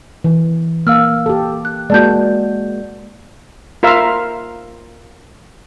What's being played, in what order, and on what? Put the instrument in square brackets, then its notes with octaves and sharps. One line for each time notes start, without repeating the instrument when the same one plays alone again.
[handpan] E3
[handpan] A#3 [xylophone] F5 E6 F6
[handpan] G4 A4
[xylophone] F#6
[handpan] G#3 A#3 F#4 [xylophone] D5 A5 G6
[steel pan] F4 A#4 E5 F5